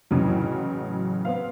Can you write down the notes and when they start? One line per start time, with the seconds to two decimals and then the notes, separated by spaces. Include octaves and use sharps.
0.11 A1 C#3 E3 F#3
1.25 B3 C4 F5